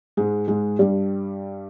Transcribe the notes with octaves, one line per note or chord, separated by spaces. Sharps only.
G#2 G#3
G#2 G#3
G2 G3